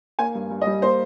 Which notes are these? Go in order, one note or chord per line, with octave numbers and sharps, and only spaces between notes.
A#3 G#5
G2
G2
D#5
G3
A#3 C5